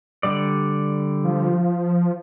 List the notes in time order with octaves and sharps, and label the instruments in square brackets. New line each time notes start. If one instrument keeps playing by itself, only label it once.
[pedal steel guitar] D3 G3 D5
[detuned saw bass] F3